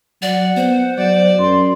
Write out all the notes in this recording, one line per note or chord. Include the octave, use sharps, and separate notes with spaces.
F#3 D5 F#5
B3 C5
F#3 D5
F#2 C6